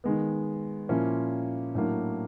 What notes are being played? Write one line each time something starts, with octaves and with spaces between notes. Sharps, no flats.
D#3 G#3 B3
A#2 F3 A#3 C#4 E4
A2 F#3 A#3 D4